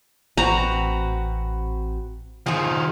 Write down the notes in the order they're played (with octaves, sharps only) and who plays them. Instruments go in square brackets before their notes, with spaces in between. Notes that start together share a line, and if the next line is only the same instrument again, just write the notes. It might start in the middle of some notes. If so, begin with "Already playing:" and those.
[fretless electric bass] A1 [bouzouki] C4 F#4 B4 [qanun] A#5
[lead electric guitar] D#3 F3 [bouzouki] F4 G#4